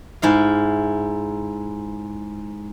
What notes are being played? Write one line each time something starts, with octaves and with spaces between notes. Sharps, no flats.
G#2 E4 F5